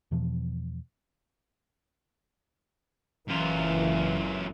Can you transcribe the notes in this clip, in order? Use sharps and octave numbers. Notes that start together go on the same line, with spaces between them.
E2 B2 E3 F3
F#1 F#2 E3 F4